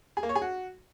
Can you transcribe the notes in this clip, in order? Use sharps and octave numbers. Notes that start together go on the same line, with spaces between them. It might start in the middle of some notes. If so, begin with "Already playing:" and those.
G#4
A#3
C#5
G#4
F#4